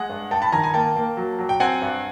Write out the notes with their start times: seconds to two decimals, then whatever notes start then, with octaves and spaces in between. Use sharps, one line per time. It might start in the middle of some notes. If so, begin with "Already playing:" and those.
Already playing: G#3 F#5 G#5
0.10 G2
0.31 G2 G5 A5
0.42 A5 B5
0.52 D#3 G#5 A#5
0.63 G#5 A#5
0.74 A#3 G5 A5
0.96 A#3
1.17 F#3
1.39 F#3
1.49 G5
1.60 C4 F#5 G#5
1.82 G2